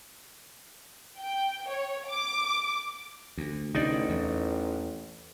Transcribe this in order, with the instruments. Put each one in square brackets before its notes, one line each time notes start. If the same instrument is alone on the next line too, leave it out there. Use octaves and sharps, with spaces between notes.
[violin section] G5
C#5
D6
[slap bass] D2
[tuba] A1 [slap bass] D2 C3 [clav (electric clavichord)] D#4 D5
[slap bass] E2